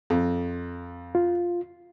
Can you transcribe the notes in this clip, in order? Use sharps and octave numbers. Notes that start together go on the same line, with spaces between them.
F2
F4